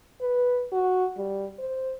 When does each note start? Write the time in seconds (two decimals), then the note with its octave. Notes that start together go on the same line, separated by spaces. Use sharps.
0.21 B4
0.72 F#4
1.17 G3
1.59 C5